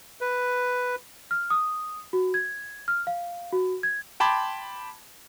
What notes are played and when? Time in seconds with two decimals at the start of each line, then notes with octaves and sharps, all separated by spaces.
0.21 B4
1.31 F6
1.50 D#6
2.13 F#4
2.34 G#6
2.88 F6
3.07 F5
3.53 F#4
3.83 G#6
4.20 G5 A5 B5 C6 D6 G#6